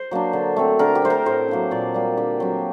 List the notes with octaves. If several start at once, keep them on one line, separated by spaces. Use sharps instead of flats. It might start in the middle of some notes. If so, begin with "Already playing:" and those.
Already playing: C5
F#3 A#3 D4
D3
A3 C4
D3 A#4
G4
A3 C4 C5
A#4
A2 C5
F#3 A#3 D4
A#2 D5
G3 A#3
D3 G4
F#3 C4